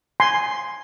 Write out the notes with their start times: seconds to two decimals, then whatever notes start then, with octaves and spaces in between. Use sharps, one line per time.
0.20 G#5 C6